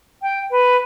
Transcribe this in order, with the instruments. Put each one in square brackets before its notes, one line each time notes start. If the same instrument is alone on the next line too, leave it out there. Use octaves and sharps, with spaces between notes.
[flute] G5
B4